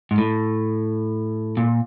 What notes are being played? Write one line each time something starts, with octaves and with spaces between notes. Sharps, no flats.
G#2
A2
A#2